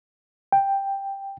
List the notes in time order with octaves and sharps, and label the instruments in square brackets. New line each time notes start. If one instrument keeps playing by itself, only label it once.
[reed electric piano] G5